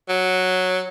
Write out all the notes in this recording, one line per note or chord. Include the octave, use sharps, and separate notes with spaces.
F#3